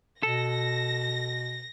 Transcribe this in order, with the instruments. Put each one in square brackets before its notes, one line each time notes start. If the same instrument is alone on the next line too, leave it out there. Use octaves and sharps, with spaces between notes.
[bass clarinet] B2 [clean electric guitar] A4 [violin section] A#6